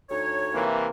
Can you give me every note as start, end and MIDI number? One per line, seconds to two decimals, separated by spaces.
0.10 0.64 38
0.10 0.64 63
0.10 0.64 73
0.54 0.88 48
0.54 0.88 52
0.54 0.88 58